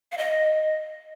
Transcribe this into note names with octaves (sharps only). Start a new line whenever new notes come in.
F5
D#5